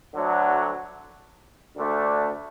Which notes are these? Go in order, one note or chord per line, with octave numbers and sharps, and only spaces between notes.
D2 D3 F#3
D2 D3 A3 D4